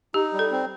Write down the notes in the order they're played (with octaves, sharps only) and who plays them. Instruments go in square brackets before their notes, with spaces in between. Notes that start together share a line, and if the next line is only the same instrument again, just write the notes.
[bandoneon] D#4 [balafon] G4
[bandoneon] G3
[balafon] A4
[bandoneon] C4